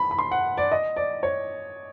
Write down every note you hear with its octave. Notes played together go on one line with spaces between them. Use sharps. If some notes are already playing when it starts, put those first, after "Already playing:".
Already playing: B5
B5
C6
F#5
D5
D#5
D5
C#5